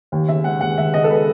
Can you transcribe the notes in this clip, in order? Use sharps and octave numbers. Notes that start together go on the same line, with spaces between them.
D#2
C#3 E5
G#3 F#5
D#2 F#5
D#2 E5
C#3 D#5
A4
G#3 B4